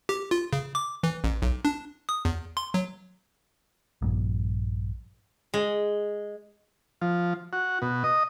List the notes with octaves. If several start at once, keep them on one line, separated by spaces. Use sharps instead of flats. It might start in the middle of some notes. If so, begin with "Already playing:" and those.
G4
F4
C#3
D6
E3
A1
B1
D4
D#6
E2
C6
F#3
A#1 G2 A#2 F3
G#3
F3
F#4
B2
D#5